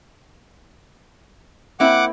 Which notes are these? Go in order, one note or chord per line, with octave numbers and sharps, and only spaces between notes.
A#3 C4 E4 F#5 D6